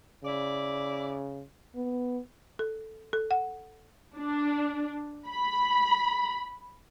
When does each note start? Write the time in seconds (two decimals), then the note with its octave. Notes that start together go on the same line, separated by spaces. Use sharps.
0.24 C#3 E4 D5
1.76 B3
2.59 A4
3.13 A4
3.31 F#5
4.17 D4
5.28 B5